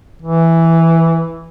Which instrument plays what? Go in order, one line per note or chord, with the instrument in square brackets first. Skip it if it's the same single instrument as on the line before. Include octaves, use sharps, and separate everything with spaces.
[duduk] E3